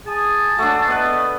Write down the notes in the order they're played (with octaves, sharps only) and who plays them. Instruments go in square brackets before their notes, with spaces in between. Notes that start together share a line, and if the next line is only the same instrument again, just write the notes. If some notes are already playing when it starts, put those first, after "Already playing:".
[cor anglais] G#4 [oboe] A5
[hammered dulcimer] A3 D4 [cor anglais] F#4
[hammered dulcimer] B3 B4 [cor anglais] D#5